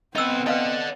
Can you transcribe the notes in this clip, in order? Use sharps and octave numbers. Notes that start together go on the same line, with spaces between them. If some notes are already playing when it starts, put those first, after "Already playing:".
B3 C4 D#4 B4 D#5 E6
B4 D5 D#5 F5 F#5 A5